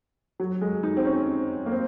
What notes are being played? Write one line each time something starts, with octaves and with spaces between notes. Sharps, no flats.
F#3
G#3
D#4
C4
C#4
A#3
C4